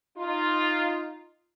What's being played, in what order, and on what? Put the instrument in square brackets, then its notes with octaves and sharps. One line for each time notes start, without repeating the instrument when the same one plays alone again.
[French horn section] D#4 F4